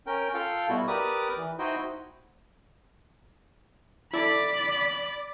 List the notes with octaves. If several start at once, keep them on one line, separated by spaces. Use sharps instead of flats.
C#4 A#4 G5
F4 A4 F5 G5
B2 G3 B3 E4 F#4
G4 A#4 B4 D5 D6 D#6
E3
D#4 E4 F#4 C5 D#5 G5
E4 A4 D5 B5